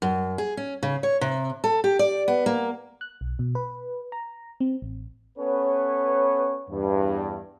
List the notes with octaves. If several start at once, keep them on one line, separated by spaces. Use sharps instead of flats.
F#2
G#4
C#4
C#3
C#5
C3
A4
G4
D5
B3
A#3
F#6
B1
B2
B4
A#5
C4
A1
B3 C#4 A4 B4 C#5
E2 G2